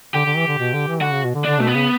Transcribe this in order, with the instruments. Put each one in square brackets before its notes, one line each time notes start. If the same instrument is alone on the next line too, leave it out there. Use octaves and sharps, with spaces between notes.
[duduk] D3 [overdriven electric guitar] G4
[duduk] D3
E3
D3
B2
D3
E3
[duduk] D3 [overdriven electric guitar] F#4
[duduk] C#3
B2
D3
[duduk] D3 [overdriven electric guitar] D4
[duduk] B2 [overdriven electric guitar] A3
[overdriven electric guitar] B3
[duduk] C#3